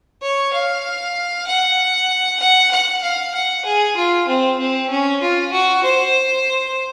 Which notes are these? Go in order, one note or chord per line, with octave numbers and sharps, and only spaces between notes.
C#5
F5
F#5
F#5
F#5
F5
F#5
G#4
F4
C4
C4
C#4
F4
F#4
C5